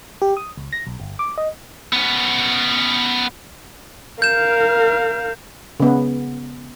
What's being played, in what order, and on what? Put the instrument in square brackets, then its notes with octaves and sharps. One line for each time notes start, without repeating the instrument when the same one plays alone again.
[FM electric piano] G4
D#6
C#2
A#6
B1
G1
D6
D#5
[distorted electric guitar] B3 C#4
[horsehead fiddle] A#4 F5 [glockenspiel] G6 E7
[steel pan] C#3 B3